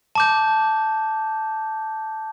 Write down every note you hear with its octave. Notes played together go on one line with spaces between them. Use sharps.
A5 D6 G6